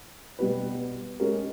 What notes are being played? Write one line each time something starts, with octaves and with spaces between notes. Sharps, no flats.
B2 G3 B3 G4 B4
G#3 C#4 G4 A#4